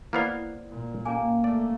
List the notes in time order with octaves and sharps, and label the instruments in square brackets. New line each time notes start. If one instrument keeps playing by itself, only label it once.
[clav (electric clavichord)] A#3 B3 F5 [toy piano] E4 C5 D5
[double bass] A#2
[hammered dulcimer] A#3 [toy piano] C#4 G#5
[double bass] A3 [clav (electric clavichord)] D5